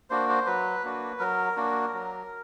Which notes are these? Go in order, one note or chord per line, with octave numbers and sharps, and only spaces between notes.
A#3 D4 F#4 C5
C5
F#3 B4
A#3 D4 F#4
F#3 A#4
A#3 D4 F#4
F#3